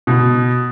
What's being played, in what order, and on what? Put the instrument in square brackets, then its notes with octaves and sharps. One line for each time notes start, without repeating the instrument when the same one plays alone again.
[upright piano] B2